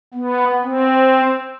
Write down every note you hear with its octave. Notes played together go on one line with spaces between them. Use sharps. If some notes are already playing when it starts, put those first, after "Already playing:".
B3
C4